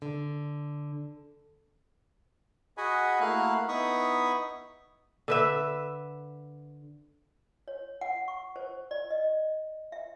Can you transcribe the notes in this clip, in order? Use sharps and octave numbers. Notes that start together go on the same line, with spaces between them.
D3
F#4 G#4 D#5 F#5 G#5 B5
A3 A#3 E4 F#4 F5 F#6
B3 D#4 E4 B5 C#6 D#6
D3 B4 E5
C#5
F#5
C#6
C5
D5
D#5
E5